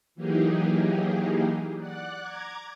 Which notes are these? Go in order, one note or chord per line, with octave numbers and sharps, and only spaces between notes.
E3 F#3 A#3 D#4 G4 G#4
D5 F#5 F#6
A#5 D6 G#6